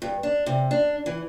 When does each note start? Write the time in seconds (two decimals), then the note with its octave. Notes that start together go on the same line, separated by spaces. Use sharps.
0.02 G2
0.23 D4
0.46 C3
0.71 D4
1.06 E3